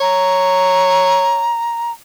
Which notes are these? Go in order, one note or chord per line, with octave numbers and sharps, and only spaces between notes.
C#5 A#5